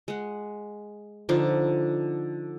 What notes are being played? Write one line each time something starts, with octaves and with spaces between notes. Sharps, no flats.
G#3 F#5
D3 F3 D#4